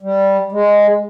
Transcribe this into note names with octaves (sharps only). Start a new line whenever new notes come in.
G3
G#3